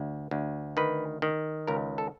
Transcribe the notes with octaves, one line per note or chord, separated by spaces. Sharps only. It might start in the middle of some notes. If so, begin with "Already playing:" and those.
Already playing: D2
D2
D#3 B4
D#3
C#2 A#4
A4